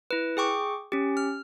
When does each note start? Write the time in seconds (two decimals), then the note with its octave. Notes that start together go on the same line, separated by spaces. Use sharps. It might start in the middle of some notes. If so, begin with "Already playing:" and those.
0.11 E4 B4
0.37 G#4 G5 C#6 D6
0.92 C#4 G4
1.17 F6